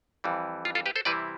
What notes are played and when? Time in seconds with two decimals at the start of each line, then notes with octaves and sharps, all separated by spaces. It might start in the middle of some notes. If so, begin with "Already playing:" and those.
0.24 F2 E3 G3
0.65 F4
0.75 F4 A4
0.86 G4 B4
0.96 A4 C5
1.05 C3 E3 G3 C4 E4 B4 D5